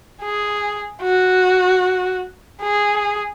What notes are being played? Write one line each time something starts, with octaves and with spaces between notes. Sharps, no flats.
G#4
F#4
G#4